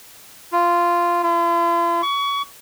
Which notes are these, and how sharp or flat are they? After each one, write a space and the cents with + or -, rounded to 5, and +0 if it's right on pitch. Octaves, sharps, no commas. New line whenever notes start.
F4 -10
F4 -45
C#6 +25